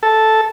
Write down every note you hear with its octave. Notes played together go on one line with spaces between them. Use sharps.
A4